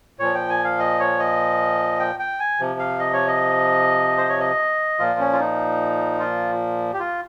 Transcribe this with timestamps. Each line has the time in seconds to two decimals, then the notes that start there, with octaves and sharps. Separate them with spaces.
0.19 A#2 F3 C#5
0.35 G5
0.50 G#5
0.64 F5
0.79 D#5
1.00 C#5
1.19 D#5
2.00 G5
2.19 G5
2.40 G#5
2.60 C3 F3
2.80 F5
2.99 D#5
3.13 C#5
3.27 D#5
4.18 C5
4.29 C#5
4.40 D#5
4.99 A#2 F3 F4
5.19 C#4
5.33 F4
5.40 D#4
6.20 F4
6.93 G4
7.00 F4